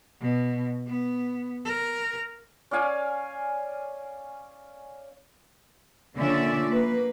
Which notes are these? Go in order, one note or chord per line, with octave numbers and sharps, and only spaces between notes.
B2
B3
A#4
C#4 D5 F5 G#5
D3 A#3 C#4 F4 D5 E5
A#3 B4